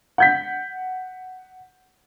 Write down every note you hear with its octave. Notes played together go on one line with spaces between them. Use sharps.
F#5 G6 B6